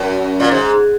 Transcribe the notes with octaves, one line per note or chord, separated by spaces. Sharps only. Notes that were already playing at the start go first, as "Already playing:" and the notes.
Already playing: F#2
A#2
G#2